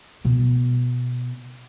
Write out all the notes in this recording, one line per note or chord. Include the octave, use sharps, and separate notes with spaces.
B2 B3